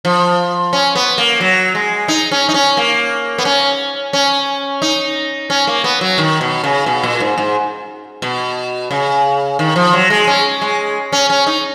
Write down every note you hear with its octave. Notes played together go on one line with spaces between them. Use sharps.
F3
C#4
B3
A#3
F#3
G#3
D#4
C#4
D#4
C#4
A#3
B3
C#4
C#4
D#4
C#4
A#3
B3
F#3
D#3
B2
C#3
B2
A#2
G#2
G#2
B2
C#3
D#3
F3
F#3
G#3
C#4
G#3
C#4
C#4
D#4